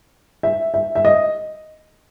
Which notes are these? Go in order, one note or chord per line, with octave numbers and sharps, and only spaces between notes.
E5
E5
E5
D#5